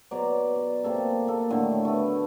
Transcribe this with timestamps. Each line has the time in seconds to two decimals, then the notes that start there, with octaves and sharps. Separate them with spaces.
0.11 B2 F#3 D5 A#5
0.56 D5
0.84 C3 A#3 A4
1.28 A#3 A4
1.50 A2 D3 D#3 F#3
1.85 A3 B3